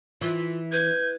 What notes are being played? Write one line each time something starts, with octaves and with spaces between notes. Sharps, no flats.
E3 F4
B4 G6 G#6